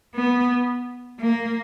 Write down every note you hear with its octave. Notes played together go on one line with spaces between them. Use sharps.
B3
A#3